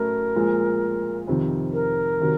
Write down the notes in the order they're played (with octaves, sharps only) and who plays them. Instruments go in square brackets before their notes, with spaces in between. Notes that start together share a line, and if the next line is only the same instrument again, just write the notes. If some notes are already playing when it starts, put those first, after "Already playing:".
Already playing: [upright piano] A2 F#3 A3 C#4 E4 [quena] A#4
[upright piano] A#2 F3 G#3
F2 C3 D#3
[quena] A#4
[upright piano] C3 D#3 F#3